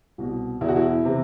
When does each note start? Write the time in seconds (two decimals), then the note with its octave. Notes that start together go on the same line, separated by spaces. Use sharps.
0.18 C2 B2
0.61 E2 E4
0.64 B2 F#4
0.76 E4
1.05 C3 E3